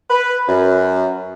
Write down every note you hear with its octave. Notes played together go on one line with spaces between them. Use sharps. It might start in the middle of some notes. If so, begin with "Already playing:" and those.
B4
F#2